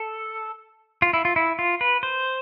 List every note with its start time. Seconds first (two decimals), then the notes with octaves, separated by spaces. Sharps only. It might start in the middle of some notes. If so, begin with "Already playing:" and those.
Already playing: A4
1.02 F4
1.13 E4
1.25 F4
1.36 E4
1.59 F4
1.81 B4
2.03 C5